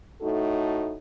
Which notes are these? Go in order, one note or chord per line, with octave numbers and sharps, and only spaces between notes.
A2 A3 D#4 F#4 A4